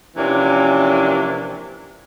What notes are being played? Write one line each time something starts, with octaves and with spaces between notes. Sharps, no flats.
C3 E3 F3 A#3 C#4 D4